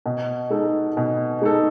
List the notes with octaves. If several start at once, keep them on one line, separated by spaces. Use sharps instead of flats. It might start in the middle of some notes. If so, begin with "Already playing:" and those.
B2
G#3 D#4 A4
B2
G#3 D#4 A4